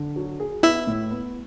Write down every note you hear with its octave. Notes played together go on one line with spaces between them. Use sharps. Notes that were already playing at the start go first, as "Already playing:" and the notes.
Already playing: D3
F#3
G#4
B3 E4 E5
A2
B3